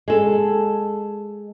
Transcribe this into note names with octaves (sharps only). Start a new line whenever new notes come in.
G#3 A4